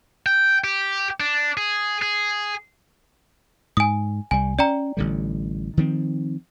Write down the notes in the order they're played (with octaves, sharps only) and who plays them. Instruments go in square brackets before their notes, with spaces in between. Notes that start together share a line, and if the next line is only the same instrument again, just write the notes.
[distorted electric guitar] G5
G4
D4
G#4
G#4
[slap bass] G#2 [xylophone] G#5 D#6
[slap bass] C2 G3 [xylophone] G#5
[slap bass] C#4 [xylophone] D5 G5 A#5
[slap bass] A1 D3 G3
D#3 F3 C4